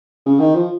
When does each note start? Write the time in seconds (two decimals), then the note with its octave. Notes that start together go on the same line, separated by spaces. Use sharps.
0.26 C#3
0.40 D#3
0.55 F3